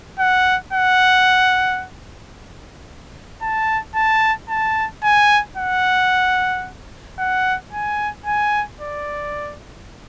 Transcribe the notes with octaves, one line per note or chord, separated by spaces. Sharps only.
F#5
F#5
A5
A5
A5
G#5
F#5
F#5
G#5
G#5
D5